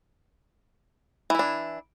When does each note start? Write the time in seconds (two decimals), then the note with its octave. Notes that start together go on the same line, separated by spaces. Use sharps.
1.30 E3
1.35 E4
1.39 D4